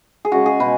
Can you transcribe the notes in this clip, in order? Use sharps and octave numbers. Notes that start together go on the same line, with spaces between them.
G#4
C#3 G#3 C#4 F#4
G#4
B2 G#3 C#4 B4